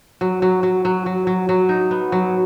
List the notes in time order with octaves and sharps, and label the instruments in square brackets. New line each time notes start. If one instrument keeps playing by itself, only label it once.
[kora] F#3
F#3
F#3
F#3
F#3
F#3
F#3
D#4
B3
F#3